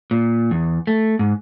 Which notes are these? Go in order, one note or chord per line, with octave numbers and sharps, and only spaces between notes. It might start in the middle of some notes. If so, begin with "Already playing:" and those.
A#2
E2
A3
G#2